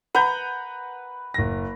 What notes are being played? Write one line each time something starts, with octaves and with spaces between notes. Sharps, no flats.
B4 F#5 A#5 G6
F#1 A#6